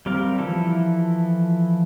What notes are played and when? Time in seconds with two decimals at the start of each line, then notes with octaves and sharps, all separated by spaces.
0.06 G3 C4 A#4 F5
0.39 E3 F3 E4 A4